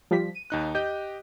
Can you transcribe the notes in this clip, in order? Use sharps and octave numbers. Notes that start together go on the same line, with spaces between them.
F3 G3 B6
D#7
D#2 D#4 F#6
G4 D#5 G6